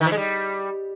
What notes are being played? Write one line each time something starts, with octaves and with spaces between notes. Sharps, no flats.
D#3
E3
G#3
G3